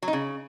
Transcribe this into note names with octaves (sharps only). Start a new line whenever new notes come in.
F#3
D#4
C#3